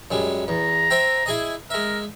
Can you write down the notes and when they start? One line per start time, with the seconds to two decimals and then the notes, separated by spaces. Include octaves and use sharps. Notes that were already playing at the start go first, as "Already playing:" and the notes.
0.11 F#2 G3 G#3
0.48 E2 A#5
0.90 C5 E5 G5
1.26 E4 G#4 D#5
1.70 G#3 A#4 E5